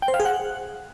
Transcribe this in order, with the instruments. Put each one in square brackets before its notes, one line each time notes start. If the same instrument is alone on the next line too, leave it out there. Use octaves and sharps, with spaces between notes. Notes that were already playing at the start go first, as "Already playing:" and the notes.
[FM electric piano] G5
C5
F5
G#4
F#5